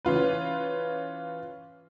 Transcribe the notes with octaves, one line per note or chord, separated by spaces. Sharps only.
E3 C#4 F4 B4